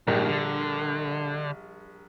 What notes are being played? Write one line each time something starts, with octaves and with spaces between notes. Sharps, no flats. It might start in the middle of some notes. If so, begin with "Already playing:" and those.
A#1 D#2 G#2 G3 A#4
D3